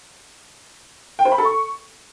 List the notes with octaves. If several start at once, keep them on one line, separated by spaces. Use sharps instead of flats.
G5
C5
B5
A4
C#6